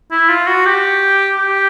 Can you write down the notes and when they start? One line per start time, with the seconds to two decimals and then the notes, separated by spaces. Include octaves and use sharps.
0.11 E4
0.29 F4
0.47 F#4
0.65 G4
1.38 G4